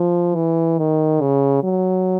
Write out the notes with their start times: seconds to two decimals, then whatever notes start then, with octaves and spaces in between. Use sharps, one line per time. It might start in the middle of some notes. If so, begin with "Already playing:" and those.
Already playing: F3
0.35 E3
0.78 D#3
1.21 C#3
1.63 F#3